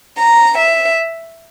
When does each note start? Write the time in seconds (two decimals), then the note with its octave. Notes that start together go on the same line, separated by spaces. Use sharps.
0.18 A#5
0.56 E5